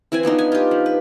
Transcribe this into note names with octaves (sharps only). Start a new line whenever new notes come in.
E3 C4 E4 G#5
F3 B3 D4 D#4
G#5
F4 G4
F3
B4